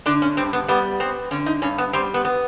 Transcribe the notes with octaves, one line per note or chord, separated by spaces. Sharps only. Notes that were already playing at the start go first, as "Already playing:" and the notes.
D3 D4
C#4
G2 C4
B3
G3 B3
B3 C4
D3 C#4
D#4
G2 C#4
B3
G3 C4
B3
B3